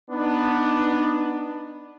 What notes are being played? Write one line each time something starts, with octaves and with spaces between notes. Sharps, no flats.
B3 D4 D#4